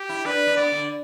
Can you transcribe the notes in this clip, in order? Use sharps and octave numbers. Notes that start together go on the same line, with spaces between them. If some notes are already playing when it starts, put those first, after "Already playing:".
Already playing: G4
E4
D4 B4
D4
B3 D5
D3